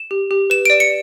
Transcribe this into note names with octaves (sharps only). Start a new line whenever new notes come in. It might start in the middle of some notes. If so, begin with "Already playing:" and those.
Already playing: E7
G4
G4
B4 E7
D5 D7
C#7